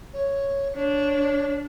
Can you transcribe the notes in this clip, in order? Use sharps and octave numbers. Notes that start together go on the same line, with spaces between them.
C#5
D4 C#5